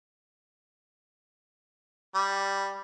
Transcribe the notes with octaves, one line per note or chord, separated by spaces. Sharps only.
G3